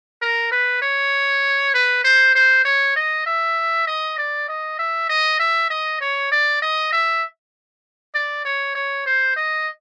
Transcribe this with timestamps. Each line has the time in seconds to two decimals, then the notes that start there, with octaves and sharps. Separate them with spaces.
0.22 A#4
0.51 B4
0.82 C#5
1.74 B4
2.04 C5
2.35 C5
2.65 C#5
2.96 D#5
3.26 E5
3.87 D#5
4.18 D5
4.48 D#5
4.79 E5
5.09 D#5
5.40 E5
5.70 D#5
6.01 C#5
6.31 D5
6.62 D#5
6.93 E5
8.15 D5
8.45 C#5
8.75 C#5
9.06 C5
9.37 D#5